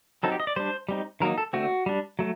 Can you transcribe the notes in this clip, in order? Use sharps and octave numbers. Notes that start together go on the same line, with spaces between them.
F#3 C4 D#4 A4
G4
D#5
D5
G3 D4 C5
G3 C4 D#4
D#3 F#3 A#3 D#4 A#4
A4
D3 A3 C4 F#4
G3 D4
F#3 A3